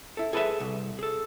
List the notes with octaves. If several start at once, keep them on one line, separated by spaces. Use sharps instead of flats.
E4 A4
G#4 A4 B4 D#5 E5 G#5
C2
G#4 A4